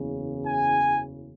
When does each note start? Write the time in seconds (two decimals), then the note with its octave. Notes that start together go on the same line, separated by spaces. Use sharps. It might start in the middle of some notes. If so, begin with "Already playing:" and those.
Already playing: F#1 E2 C#3
0.47 G#5